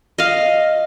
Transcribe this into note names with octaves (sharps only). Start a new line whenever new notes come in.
D#5 F5